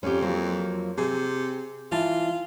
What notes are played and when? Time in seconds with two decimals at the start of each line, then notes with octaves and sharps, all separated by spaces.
0.03 F2 C#4 G4
0.22 F3 F#3 A#3
0.98 C3 G#4
1.92 E3 F4 A5